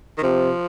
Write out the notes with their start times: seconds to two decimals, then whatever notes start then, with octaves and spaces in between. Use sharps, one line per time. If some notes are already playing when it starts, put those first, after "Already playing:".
0.18 D#3
0.23 C3 F3